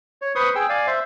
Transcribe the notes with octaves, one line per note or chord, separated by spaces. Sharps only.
C#5
B4 C5 C6 C#6 D#6
G#4 G5 E6
D5 F5 G#5
C5 E5